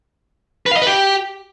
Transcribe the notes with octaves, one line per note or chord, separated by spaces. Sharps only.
B4
F5
D#5
B4
G4